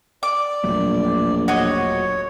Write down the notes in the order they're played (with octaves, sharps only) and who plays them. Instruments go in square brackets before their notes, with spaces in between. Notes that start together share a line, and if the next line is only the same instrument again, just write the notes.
[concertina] D5 [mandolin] D6
[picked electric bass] E1 F#3 A3 [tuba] A#1
[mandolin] F#4 D#5 [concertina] C#5